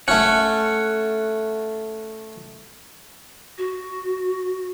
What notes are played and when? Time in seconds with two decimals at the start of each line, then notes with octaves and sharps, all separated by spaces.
0.08 A3 C#4 F#5
3.58 F#4